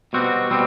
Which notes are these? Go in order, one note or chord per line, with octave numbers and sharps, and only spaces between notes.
B2 G3 C4 F#4
B2 G3 C4